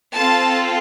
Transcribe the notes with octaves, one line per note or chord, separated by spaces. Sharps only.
C4 F4 A4 A5